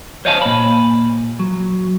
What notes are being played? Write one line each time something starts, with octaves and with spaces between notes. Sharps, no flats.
C5 C#5 D#5 F5 G#5 A5
A#2 B5
F#3